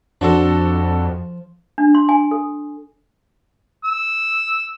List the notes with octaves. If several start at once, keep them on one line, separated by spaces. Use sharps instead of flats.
F2 F3 D4 F#4 A4
D4
C6
G#5
A4
E6